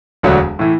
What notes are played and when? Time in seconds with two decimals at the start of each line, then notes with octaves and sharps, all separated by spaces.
0.23 E1 D2 D3 F#3
0.59 A2 E3